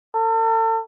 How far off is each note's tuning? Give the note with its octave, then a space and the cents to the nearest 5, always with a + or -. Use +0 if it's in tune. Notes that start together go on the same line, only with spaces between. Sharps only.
A4 +40